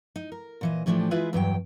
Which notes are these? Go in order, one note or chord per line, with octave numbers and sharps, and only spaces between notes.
D#4
A#4
A#2 E3 D#5
A2 E3 F3 A3 D4 G4
G#3 E4 F4 G#4 B4 E5
E2 G2 F#3 G5